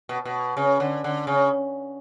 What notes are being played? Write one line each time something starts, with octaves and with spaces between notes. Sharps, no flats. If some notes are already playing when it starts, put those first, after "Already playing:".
B2
B2
C#3
D3
D3
C#3